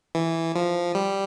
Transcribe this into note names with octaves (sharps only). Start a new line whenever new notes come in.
E3
F3
G3